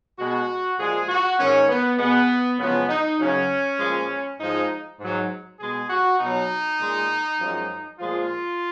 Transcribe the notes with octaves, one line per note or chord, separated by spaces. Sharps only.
B2 G#3 F#4
A#2 F3 G#3 G#4
F#4
G#2 D#3 G#3 C#4
B3
B2 G#3 B3
F#2 C#3 F3 G#3 B3
D#4
F#2 C#3 F#3 C#4
A#2 F3 G#3
G#2 F3 G#3 D#4
G#2 F#3
B2 G#3 G#4
F#4
B2 F#3 D#4
A#2 G#3
F#2 F3 G#3
A#2 F3 G#3 F4